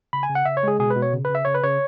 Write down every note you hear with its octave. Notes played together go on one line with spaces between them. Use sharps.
C#3 B5
G#5
C#3
F#5
C#3 E5
C#5
G#3 G#4
B2 G#4
B4
B2
C#5
C#3
B4
C#3 E5
C#3 C#5
B4
C#3 C#5